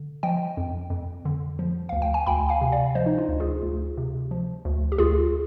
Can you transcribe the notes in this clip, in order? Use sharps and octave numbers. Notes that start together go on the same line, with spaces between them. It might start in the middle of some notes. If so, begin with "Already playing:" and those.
Already playing: D3
F3 D#5 G5
F2
F2
D3
F3
D2 F5
G5
G#5
D2 G5 B5
F5 G#5
C3
D5 F5
F3 C5 D#5
D#4
D4 F4
D2
F4 G#4
D2
C3
F3
D2
G4
D2 F4 G#4